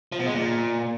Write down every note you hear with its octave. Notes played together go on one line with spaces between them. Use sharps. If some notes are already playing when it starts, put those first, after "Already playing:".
F3
B2
G#3
A#2